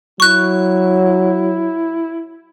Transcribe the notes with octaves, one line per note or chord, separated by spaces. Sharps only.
F#3 E4 C#6 F#6